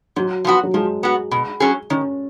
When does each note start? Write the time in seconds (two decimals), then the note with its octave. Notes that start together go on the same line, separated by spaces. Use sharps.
0.16 G#2 F#3
0.45 F3 B3 F#4
0.63 F#3
0.74 F3 G#3
1.03 B3 F#4
1.31 B2
1.60 F#3 C#4 G#4
1.90 D#3 C#4